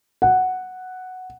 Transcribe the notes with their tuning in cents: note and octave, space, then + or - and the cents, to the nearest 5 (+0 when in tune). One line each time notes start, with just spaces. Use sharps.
F#5 +0